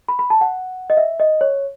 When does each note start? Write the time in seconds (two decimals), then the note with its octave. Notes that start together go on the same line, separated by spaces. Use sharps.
0.08 B5
0.19 B5
0.30 A5
0.41 F#5
0.90 D#5
0.97 E5
1.20 D#5
1.41 C#5